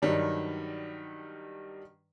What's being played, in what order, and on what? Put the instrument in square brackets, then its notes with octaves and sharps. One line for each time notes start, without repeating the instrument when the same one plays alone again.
[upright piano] G2 D#3 F#3 G3 D4